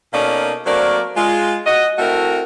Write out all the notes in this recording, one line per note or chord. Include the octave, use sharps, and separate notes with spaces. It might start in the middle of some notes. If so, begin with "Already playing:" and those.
B2 A#3 C#4 D#4 A4 D5
F#3 A3 A#3 C4 A#4 D5
G#3 F4
F#4 D#5
A3 C4 E4 F#4 A4 A#4